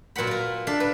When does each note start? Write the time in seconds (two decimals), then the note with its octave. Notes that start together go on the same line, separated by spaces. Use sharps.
0.16 A#2 F#3 A#4 F#5 B5
0.27 F4 A#4
0.67 D4 A4 E5 F5
0.80 B4